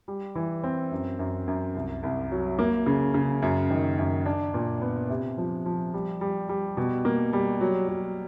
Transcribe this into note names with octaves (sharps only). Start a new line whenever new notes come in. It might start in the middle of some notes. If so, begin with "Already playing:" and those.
G3
E3
C4
F#2
F#2
F#2
C2
C2
F#3
A#3
C#3
C#3
F#2
D#3
F#2
D4
A#2
B3
C3
F3
F3
G3
G3
G3
B2
A#3
G3
F#3
F#3